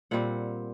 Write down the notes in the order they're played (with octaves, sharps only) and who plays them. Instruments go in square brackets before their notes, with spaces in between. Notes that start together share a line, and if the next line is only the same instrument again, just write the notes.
[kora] A#2 G3 C4 F#5